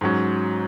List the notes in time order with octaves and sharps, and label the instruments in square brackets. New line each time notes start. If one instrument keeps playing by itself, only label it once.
[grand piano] G#2 F#3 C#4